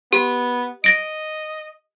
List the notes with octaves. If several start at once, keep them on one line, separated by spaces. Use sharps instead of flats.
B3 G4
D#5 A#6 D7